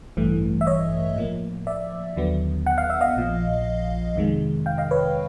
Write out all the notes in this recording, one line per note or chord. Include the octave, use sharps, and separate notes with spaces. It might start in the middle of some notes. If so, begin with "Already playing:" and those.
A1 G2 E3 A3
E5
C#5 D#5
A2 F3 A#3
D5 E5
D#2 D3 F#3 B3
F#5
F5
E5
D#5 F5
A#1 A#2 F3
F2 C3 D#3 G#3
F5 G5
D#5 F5
B4 C#5